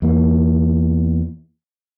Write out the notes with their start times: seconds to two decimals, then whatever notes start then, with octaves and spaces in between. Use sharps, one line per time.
0.02 E2 A#3